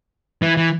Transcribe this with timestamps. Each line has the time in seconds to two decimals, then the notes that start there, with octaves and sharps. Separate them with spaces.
0.42 E3
0.57 E3